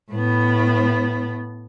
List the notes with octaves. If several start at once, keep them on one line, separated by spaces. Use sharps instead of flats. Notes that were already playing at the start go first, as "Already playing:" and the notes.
A2 B3